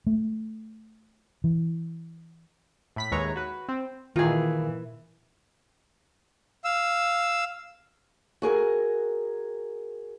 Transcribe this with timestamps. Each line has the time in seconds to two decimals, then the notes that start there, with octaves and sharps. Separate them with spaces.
0.07 A3
1.44 E3
2.96 A2 B5 B6
3.12 D#2 G#3 E4 B4 C#5 A#5
3.36 F#4 B4
3.69 C4
4.16 A#2 D#3 E3 F4 G#4
6.64 F5 E6
8.42 F#4 G#4 A#4